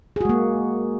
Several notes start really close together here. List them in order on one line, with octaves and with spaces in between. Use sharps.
G#4 F#4 G#3 A#3